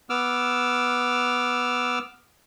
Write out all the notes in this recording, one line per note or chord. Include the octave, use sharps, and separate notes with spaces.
B3 D6 E6 F6